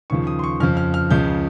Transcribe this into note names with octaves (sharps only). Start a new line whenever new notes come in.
D#2 C#3 F3 C#6
D#6
C6
C#6
F2 C#3 F3 F6
F6
F6
C#2 C#3 F3 G6